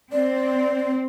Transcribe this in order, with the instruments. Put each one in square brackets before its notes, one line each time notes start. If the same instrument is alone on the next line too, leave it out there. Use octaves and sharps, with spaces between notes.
[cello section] C4 [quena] D5